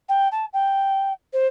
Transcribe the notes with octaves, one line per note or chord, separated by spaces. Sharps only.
G5
A5
G5
C5